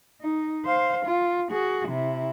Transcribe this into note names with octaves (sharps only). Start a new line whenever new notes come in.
D#4
C5 F5
F4
F#4 G#4
C3 E4